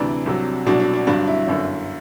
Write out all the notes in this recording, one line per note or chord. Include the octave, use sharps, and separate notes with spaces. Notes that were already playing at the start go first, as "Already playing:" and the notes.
Already playing: D2 C3 E3 D4
C2 C3 F#3
C2 B2 F#3 D4
D4
D4
G1 G2 F#3 D4
E4
G1 F#2 D3